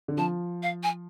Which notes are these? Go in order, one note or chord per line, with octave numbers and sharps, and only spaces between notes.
D3
F3 A5
F5
G#5